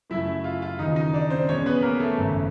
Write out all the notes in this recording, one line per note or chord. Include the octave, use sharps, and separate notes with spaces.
F#2 C#3 F#3 A3 E4 E5
F4 F5
F4 F5
D#2 C#3 E3 D#4 D#5
D#4 D#5
D4 D5
C4 C5
E2 B2 G#3 C#4 C#5
B3 B4
A#3 A#4
A3 A4
G#1 F#2 C#3